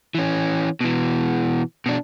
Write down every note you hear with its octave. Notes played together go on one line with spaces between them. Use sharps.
E3 C#4
B2 E3
B2 D4